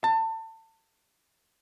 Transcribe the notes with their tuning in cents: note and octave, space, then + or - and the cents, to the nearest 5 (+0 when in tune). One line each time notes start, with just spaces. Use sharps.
A5 +30